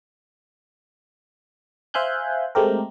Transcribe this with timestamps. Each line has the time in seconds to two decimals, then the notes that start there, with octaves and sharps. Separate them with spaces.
1.94 C5 E5 F5 G#5 F#6 G6
2.55 G#3 A3 C4 G4 A#4